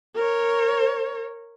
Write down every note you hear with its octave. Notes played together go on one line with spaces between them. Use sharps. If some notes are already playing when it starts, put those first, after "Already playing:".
A#4 C#5